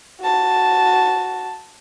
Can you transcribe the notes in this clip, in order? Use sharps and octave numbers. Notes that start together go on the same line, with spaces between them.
F#4 A5